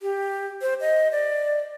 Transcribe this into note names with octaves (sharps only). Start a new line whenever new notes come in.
G4
C5
D#5
D5